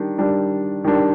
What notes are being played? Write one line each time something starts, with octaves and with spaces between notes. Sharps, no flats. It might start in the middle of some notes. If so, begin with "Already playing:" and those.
Already playing: D#3 G3 D4
D#3 G3 D4
D#3 G3 D4